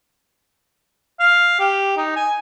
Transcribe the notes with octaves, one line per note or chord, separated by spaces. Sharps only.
F5
G4
D#4
G#5